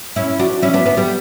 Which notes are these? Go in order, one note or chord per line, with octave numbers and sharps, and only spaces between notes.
C#4 E4
D4 F#4
C#4 E4
B3 D4
B3 D4
G3 B3